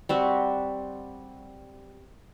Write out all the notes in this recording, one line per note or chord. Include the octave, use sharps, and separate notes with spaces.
G3 C4 F#4